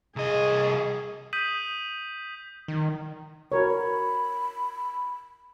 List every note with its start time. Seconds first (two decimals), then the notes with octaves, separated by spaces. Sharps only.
0.16 C2 G#4 D#5
1.33 D#6 G6 B6 D#7 F#7
2.68 D#3
3.52 F#4 A#4 C#5 B5